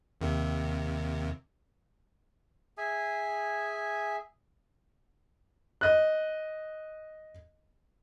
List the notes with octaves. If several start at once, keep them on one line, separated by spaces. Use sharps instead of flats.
D#2 C3
G#4 E5 G#5
D#5 F#6